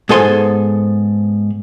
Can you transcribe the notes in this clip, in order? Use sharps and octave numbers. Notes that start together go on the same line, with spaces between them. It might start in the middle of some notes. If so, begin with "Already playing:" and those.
G#2 B3 A4 C5 G#5 C6